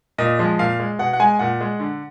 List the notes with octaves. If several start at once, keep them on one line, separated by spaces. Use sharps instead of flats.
A#2 D#5
F3 G#3
A#2 F5
G#3
B2 F#5
F#5
G#3 G#5
A#2 F#5
G#3
D3